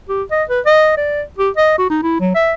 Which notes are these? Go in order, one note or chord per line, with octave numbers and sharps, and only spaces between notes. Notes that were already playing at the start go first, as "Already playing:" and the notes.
G4
D#5
B4
D#5
D5
G4
D#5
F#4
D#4
E4
F#3
E5